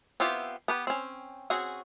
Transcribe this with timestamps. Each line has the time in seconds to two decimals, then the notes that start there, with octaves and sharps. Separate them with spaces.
0.20 B3 C4 E4 F4 G4
0.68 B3 G4 B4
0.87 C4 C#4
1.50 C4 C#4 F#4 G#4